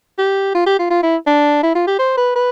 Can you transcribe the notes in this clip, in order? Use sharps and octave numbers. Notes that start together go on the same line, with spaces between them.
G4
F4
G4
F4
F4
E4
D4
E4
F4
G4
C5
B4
B4